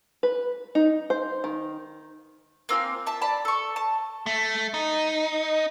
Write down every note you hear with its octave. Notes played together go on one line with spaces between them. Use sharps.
B4
D#4
C5
D#3
A#3 C4 F4 G#5
E5 A5
D5 A5 B5
A4 C#6
A5
A3
D#4